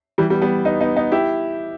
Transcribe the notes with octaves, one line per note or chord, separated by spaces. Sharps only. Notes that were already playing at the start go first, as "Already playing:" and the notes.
E3 G3
G3 B3
G3 B3
B3 D#4
B3 D#4
B3 D#4
E4 G4